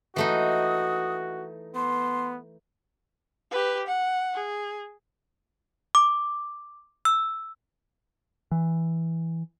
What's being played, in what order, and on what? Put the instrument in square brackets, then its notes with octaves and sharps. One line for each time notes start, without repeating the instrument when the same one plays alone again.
[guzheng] E3 A3 D#4 [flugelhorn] F#4 [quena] D#6
[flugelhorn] B3 [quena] C6
[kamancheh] G4 B4
F#5
G#4
[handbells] D6
E6
[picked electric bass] E3